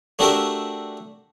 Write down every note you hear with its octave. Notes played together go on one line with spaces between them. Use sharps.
A3 D4 F#4 G4 A#4 E5